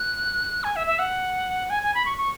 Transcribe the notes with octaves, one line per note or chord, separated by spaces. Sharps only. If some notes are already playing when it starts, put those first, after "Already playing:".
Already playing: F#6
G#5
E5
E5
F#5
G#5
G#5
B5
C#6
C#6